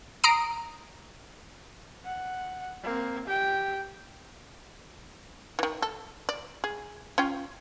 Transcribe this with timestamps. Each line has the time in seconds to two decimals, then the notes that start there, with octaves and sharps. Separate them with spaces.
0.24 A#5 D#6 C7 D7
2.05 F#5
2.83 A#3 C4
3.25 G4 G5
5.59 D#3 E3
5.82 A4
6.29 D5
6.64 G#4
7.18 C#4 F4 G5